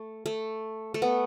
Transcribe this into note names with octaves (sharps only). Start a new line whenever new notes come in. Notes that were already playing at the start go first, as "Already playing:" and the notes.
Already playing: A3
A3
A3
B3